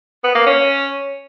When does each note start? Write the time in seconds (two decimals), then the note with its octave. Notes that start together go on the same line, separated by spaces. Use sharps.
0.24 B3
0.35 A#3
0.46 C#4